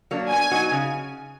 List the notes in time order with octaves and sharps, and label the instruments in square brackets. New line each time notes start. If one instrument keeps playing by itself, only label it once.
[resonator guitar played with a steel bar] F#3 A#3 D4
[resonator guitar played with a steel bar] B2 [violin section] G#5
[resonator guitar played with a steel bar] F#3 B3 D#4 F#4
C#3